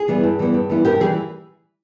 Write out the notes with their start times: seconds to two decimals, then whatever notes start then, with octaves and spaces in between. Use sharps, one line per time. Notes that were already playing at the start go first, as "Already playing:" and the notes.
Already playing: G#4
0.08 E3 G3 B3 E4
0.23 G2
0.39 E3 G3 B3 E4
0.54 G2
0.70 E3 G3 B3 E4
0.85 G2 G4 A#4
1.00 E3 G3 G#4